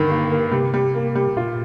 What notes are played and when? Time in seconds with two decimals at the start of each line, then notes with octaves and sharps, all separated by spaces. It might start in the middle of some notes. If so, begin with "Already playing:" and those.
Already playing: G2 D3 D#3
0.10 A#3
0.31 A#3
0.52 C3 G3
0.74 G3
0.94 A#3
1.15 G3
1.36 A#2 F4